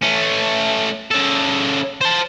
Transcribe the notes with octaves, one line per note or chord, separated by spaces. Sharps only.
A3 C#4
C#3 A4
C5 A5